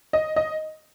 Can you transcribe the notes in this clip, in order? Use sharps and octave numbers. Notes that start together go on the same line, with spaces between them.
D#5
D#5